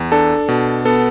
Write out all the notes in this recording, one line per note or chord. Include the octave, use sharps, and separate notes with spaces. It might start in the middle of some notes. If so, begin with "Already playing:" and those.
Already playing: E2
D4 A4
B2
B3 A4